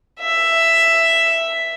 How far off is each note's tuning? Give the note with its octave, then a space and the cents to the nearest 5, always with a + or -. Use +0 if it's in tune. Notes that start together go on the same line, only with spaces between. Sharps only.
E5 +5